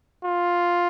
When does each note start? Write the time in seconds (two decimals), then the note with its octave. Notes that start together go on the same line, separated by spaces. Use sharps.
0.25 F4